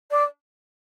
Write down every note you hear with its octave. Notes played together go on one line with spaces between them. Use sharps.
D5